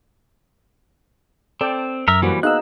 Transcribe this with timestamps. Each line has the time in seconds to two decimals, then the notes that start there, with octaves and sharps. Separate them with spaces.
1.61 C4 A4 D5 G5
2.08 F#2 A#4 E5
2.22 E3 G3 A#3 F#4 C5
2.43 B3 D#4 G#4 D#5 F5 E6 F#6